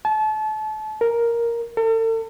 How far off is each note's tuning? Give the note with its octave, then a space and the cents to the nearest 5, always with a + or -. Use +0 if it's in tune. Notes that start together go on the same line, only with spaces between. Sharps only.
A5 -30
A#4 +5
A4 +40